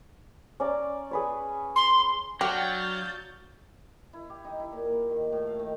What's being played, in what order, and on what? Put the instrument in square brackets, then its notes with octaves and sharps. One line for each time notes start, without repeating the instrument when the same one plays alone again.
[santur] C#4 D5 A#5
G#4 B4 C#5
[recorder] C6
[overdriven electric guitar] F#3 [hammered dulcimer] D4 F#4 F5 [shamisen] G4 [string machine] G6 A6
[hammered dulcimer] E4
G4
D#4
E4
A#2
A#4
D#3
A2
F5
D#3